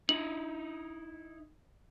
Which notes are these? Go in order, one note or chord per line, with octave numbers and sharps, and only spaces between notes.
D#4 E4 F#7